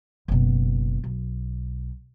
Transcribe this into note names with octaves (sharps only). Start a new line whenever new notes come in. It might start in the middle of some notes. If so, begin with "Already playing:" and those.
F#1 B2
B1